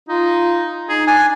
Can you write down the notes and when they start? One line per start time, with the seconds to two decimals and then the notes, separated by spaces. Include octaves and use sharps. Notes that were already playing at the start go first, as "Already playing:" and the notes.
0.09 D#4 F4
0.89 D#4 G#4
1.07 D4 G#5